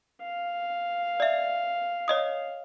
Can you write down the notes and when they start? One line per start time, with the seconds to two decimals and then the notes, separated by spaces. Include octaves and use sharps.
0.22 F5
1.20 D5 E5
2.08 C#5 D#5 D#6